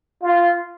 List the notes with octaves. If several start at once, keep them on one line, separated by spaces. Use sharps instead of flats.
F4